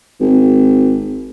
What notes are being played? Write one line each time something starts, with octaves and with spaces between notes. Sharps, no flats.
G#1